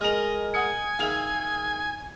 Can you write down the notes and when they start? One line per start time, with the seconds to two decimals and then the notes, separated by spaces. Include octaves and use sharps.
0.01 G#3 A#4 D#5 F6 F7
0.54 F#5 G#5 D#6 C#7
0.99 D#3 G#4 E5 F5 F7